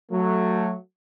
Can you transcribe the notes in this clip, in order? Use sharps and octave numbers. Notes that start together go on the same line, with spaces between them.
F#3 A3